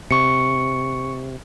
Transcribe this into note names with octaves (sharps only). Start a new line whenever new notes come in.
C3 C#6 C#7